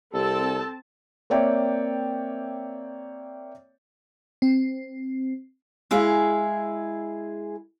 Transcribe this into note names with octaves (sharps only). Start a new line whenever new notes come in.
C2 C4 G4 A4 A5
A#3 C4 C#5 D5 E5 G5
C4
G#3 E4 G#4 F5